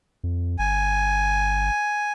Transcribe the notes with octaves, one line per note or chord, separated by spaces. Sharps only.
F2
G1 G#5